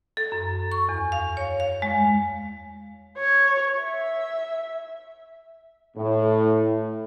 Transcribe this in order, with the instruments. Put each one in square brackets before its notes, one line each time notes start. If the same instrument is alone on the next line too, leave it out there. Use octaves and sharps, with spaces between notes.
[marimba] A4
F#2
C#6
E2
F5
C#5
F5
G#3
[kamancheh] C#5
E5
[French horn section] A2